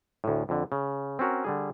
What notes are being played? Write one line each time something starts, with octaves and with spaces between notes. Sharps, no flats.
D2 A2
F2 D3
C#3
C4 C#4 F#4 A#4
D3 G3 G#4